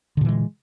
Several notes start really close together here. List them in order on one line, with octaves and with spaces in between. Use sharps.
D3 A#2 E3 G#3